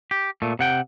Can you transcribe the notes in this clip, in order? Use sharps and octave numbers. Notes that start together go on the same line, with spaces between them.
G4
A#2 A3
C3 F#5 G5